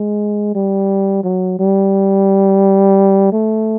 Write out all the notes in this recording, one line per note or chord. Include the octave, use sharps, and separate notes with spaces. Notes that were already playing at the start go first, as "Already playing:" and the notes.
Already playing: G#3
G3
F#3
G3
A3